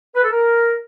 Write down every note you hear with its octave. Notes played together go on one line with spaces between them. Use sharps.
B4
A4
A#4